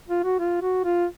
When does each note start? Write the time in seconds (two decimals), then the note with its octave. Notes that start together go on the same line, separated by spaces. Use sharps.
0.08 F4
0.23 F#4
0.39 F4
0.62 F#4
0.85 F4